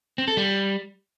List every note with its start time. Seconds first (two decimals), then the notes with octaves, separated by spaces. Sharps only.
0.18 C4
0.28 A4
0.37 G3